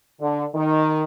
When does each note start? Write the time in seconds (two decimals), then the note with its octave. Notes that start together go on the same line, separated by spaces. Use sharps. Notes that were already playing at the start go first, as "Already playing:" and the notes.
0.21 D3
0.55 D#3